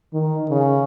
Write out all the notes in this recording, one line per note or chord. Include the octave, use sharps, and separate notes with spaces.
D#3
C#3